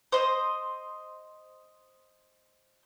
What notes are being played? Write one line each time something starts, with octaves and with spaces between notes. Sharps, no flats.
C5 D#5